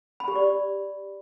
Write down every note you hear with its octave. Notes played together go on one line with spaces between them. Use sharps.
B5
G4
D5